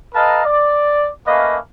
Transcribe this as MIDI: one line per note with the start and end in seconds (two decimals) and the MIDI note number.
0.14 0.45 69
0.14 0.45 71
0.14 0.45 75
0.14 0.45 77
0.14 0.45 81
0.14 0.45 82
0.45 1.08 74
1.27 1.57 57
1.27 1.57 58
1.27 1.57 61
1.27 1.57 71
1.27 1.57 75
1.27 1.57 77